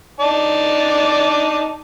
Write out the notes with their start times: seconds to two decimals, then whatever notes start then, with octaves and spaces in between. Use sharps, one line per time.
0.20 D#4 D5 A5